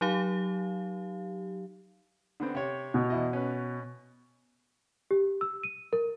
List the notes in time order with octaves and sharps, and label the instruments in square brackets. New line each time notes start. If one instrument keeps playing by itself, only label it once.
[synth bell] F#3 D#4 G4 F5
[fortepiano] D3 B3 C4
C3 C#5
[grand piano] B2
[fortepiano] E2 E4 D#5
C#4 B4
[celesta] G4
E6
D#7
A#4